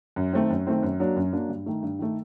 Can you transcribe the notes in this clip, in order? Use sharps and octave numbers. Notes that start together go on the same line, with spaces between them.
F#2
D#3 A3 C4
F#2
D#3 A3 C4
F#2
F#3 A#3 D4
F#2
F#3 A#3 D4
G2
D#3 A3
G2
D#3 A3